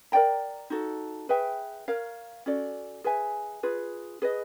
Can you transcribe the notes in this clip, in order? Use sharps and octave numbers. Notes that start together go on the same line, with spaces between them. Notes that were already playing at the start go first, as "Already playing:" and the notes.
A#4 D5 G5 A#5
D#4 F#4 A4
G#4 B4 E5 G5
A#4 C#5 F5
C#4 F#4 A4 D5
G#4 B4 E5 G#5
F4 G#4 B4
G#4 B4 D#5